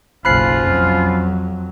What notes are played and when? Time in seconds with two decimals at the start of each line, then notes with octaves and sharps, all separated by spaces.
0.25 F#1 B1 F3 C#4 F4 B5 F#6 C7
0.61 F2 F#3